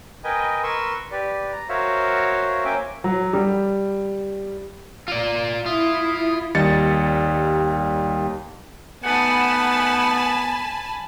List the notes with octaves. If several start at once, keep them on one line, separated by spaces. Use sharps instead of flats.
A#4 B4 D#5 G5 G#5
A#4 B4 C6 C#6 E6
G4 B4 D5
A#5
F#4 A#4 C5 C#5 E5 F5
A#3 C#4 E5 G5 G#5 D6
F#3
G3
F4 D5
E4 F4 D#6
D#2 G3 D#5 A6 C#7
A3 B3 D#4 F#5 G#5 A5 B5